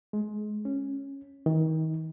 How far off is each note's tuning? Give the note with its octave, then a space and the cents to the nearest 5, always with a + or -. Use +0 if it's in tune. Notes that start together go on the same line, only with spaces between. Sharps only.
G#3 +25
C#4 -10
D#3 +30